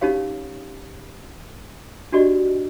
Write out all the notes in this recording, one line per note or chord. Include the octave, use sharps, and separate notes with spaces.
C#4 D#4 G4 C#5 F5
D4 F#4 G4 D5 D#5